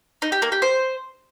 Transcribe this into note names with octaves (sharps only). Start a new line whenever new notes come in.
D#4
G4
A#3
G4
C5